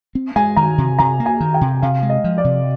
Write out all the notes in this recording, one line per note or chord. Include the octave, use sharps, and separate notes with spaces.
C4
G#3 G#5
D#3 A#5
C3
C3 A#5
A#3
G#5
D#3
G5
C3
C3 F5
G#3
D#5
F3
D5
C3